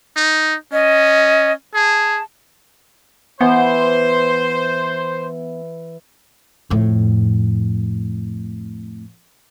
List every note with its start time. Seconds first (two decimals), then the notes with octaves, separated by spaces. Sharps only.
0.16 D#4
0.73 C#4 D#5
1.74 G#4 A5
3.41 E3 B3 C5
6.70 F2 A2